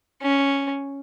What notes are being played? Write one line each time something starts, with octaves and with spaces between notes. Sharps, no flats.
C#4